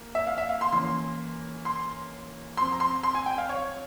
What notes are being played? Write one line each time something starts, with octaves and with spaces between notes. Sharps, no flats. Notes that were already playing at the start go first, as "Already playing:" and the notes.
Already playing: A#3
E5
F5
E5
F5
C6
E3 A#3 C#4 C6
C6
F3 C4 C6
A#5
C6
C6
G#5
G5
F5
C#5